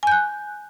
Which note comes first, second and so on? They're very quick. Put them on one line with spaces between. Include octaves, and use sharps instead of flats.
G#5 G6 F#6